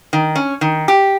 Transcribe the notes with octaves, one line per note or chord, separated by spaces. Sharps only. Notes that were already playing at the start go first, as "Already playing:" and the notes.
D#3
C#4
D#3
G4